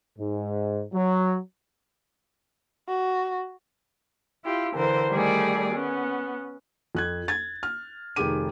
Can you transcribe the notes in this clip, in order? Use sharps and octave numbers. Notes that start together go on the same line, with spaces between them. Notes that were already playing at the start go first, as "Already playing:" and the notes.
G#2
F#3
F#4
E4 F4 G4
D3 E3 A#4 C5
D#3 G3 A3 G#4 D5
B3 C#4
F2 F#6 G#6
G#6 A6
F6
F1 D#3 G4 G#4 D6 D#7